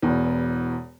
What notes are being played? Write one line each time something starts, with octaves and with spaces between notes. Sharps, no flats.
E1 E2